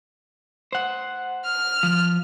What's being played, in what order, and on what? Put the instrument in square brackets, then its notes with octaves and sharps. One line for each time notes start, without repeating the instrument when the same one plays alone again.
[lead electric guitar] C5 F#5
[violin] F6
[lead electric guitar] F3